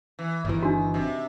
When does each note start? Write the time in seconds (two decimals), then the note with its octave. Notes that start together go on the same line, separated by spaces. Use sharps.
0.19 E3
0.45 G1 D#3 E3
0.63 D4 F#4
0.94 C3